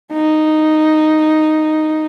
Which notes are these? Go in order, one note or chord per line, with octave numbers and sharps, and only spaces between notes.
D#4